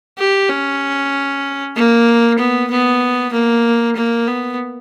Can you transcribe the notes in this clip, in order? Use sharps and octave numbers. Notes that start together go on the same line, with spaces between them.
G4
C#4
A#3
B3
B3
A#3
A#3
B3